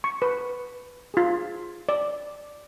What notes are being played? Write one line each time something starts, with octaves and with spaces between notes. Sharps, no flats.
C#6
B4
F4 G#4
D5